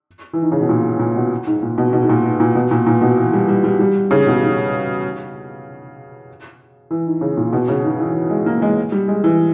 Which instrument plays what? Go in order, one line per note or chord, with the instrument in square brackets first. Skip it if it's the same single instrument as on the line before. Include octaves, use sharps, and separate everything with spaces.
[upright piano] E3
D#3
C#3
B2
A#2
A#2
B2
G#2
A#2
B2
B2
G#2
A#2
G#2
A#2
B2
A#2
A#2
B2
E3
G3
G3
G3
G3
C#3
B2
D#3
E3
D#3
C#3
A#2
B2
C#3
D#3
E3
G#3
A#3
G#3
G3
G#3
E3